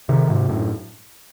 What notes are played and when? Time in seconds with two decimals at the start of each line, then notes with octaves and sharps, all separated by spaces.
0.09 C3 D#3
0.29 G#2 C3
0.48 F#2 A2